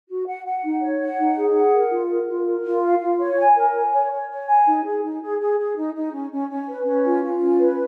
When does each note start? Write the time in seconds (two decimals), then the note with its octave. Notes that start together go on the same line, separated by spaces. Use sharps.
0.08 F#4
0.27 F#5
0.45 F#5
0.63 D#4
0.82 C#5
1.00 F#5
1.18 D#4
1.36 G#4
1.54 F#5
1.73 A#4
1.91 F4
2.09 A#4
2.28 F4
2.46 A#4
2.64 F4
2.83 F5
3.01 F4
3.19 C#5
3.38 G#5
3.56 A#4
3.75 G#5
3.92 C#5
4.11 C#5
4.29 C#5
4.47 G#5
4.66 D#4
4.84 G#4
5.03 D#4
5.21 G#4
5.39 G#4
5.58 G#4
5.76 D#4
5.94 D#4
6.12 C#4
6.31 C#4
6.49 C#4
6.68 B4
6.85 C#4
7.04 F4
7.22 F4
7.40 C#4
7.58 B4